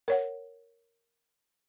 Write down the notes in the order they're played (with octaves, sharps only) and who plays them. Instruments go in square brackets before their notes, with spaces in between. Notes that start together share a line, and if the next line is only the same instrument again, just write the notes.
[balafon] A#4 C#5 F#5